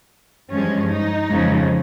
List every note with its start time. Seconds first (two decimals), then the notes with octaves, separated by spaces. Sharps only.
0.51 G2 F3 G#3 C#4
0.90 D#4
1.29 F2 C#3 F3 G#3